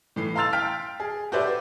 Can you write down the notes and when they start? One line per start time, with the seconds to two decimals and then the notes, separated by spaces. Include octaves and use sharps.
0.16 A2 E3 C7
0.36 F5 A#5 C6 E6 A6 F7
0.53 F5 G5 F6 B6 D7
1.00 G#4
1.32 F#4 G4 B4 C5 D5 E5